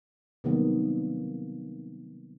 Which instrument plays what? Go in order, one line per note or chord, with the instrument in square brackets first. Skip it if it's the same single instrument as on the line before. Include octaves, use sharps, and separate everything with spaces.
[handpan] C3 D#3 F#3 G3 A#3 B3